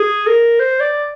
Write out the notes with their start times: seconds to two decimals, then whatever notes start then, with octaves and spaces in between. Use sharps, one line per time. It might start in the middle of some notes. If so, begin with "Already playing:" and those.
Already playing: G#4
0.27 A#4
0.60 C5
0.80 D5